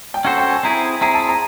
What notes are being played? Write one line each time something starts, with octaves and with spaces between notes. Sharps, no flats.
G5
C#4 F#4 A4 C5 F#5
G5
G#5
C4 E4 G#4 A#5
C4 E4 G#4 A#5
A5
A#5